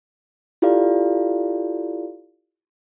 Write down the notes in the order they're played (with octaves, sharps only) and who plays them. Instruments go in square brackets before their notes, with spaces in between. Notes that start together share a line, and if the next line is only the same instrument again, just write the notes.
[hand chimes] E4 F4 G4 A4 D5 F5